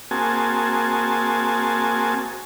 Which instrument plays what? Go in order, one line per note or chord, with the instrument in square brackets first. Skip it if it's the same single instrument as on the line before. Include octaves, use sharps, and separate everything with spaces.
[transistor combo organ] A#3 C4 F#4 G#4 G#5 A5